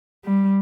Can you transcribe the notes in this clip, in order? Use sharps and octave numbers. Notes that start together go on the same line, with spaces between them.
G3